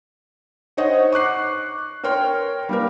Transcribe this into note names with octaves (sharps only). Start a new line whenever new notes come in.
D#4 C5 C#5 D#5 F#5 D#6
C#6 D6 F#6 C7
A#4 C#5 G5 C6 F6
G3 A#3 D4 A#4